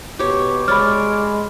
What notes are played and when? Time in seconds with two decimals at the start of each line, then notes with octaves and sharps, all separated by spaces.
0.19 B2 G4 C#5 D6
0.68 G#3 C#5 D5 B5 F6